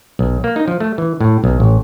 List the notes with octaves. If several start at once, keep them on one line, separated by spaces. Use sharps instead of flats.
B1
A#3
D#4
F3
A3
E3
A2
B1
A1